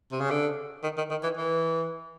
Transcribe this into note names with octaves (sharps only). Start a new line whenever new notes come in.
C3
C#3
D3
D#3
D#3
D#3
E3
E3